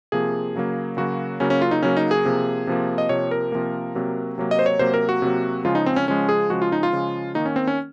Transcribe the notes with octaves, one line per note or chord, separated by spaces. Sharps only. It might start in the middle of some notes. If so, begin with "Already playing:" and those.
C3 F3 A#3 G#4
C#3 F#3 A#3
C#3 F#3 A#3 F#4
C#3 F#3 A#3 C#4
C#4
F4
D#4
C#3 F#3 A#3 C#4
D#4
G#4
C3 F3 A#3
C3 F3 A#3
D#5
C3 F3 A#3 C#5
A#4
C3 F3 A#3
C3 F#3 A#3
C3 F#3 A#3
D#5
C5
C#5
C3 F#3 A#3 C5
A#4
F#4
C3 F#3 A#3
C#3 F3 G#3 F4
D#4
C4
C#4
C#3 F3 G#3 C#4
G#4
C#3 F3 G#3 F#4
F4
D#4
F4
C#3 F3 G#3
D#3 A#3 D#4
C#4
C4
C#4